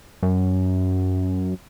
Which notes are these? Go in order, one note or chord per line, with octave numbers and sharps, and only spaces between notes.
F#2